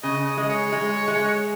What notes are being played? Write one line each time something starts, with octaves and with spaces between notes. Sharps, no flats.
C#3 D#5
D#5
G#3 D#5
C#5
G#3
G#3